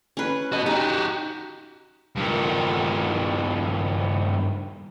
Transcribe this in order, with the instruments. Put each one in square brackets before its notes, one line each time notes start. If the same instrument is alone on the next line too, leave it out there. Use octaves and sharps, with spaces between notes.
[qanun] C#4 B4
[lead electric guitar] F#4 D#5
[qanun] D#4 [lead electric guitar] F#4 G4
[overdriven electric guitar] G2 D#3